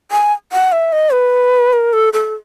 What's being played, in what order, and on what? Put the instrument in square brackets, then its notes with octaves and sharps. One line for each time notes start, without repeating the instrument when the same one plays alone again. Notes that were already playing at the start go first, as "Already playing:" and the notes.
[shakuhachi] G#5
F#5
E5
D#5
B4
A#4
A4
A4